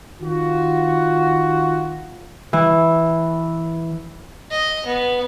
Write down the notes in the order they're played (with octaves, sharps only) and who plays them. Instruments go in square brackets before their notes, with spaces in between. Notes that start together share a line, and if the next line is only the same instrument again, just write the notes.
[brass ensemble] D#3 F4 F#4
[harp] E3
[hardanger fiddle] D#5
B3